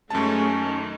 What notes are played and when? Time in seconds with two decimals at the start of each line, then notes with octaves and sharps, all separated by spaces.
0.10 F#2 G#3 A3 C#4 D#4 A5
0.59 D#3